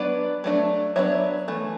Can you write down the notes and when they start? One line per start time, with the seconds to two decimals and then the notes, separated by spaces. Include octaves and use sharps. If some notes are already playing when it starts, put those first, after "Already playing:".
Already playing: F#3 B3 D4 B4 D5
0.44 F#3 A3 D4
0.96 F#3 B3 D4 C#5 E5
1.48 E3 A3